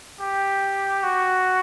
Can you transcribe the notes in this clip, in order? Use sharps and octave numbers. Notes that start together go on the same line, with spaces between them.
G4
F#4